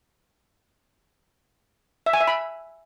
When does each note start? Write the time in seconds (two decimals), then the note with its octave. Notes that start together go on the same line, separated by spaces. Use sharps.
2.06 E5
2.13 G#5
2.21 E5
2.28 B5